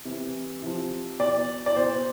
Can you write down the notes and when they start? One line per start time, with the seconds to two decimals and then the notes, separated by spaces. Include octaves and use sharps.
0.05 C3 E3
0.63 C3 F3
1.19 B2 D5
1.66 D5
1.76 B2 C5